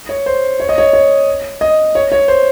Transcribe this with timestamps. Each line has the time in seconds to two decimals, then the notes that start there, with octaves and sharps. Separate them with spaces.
0.09 C#5
0.26 C5
0.60 C#5
0.69 D#5
0.78 C#5
0.93 C#5
1.61 D#5
1.95 C#5
2.12 C#5
2.28 C5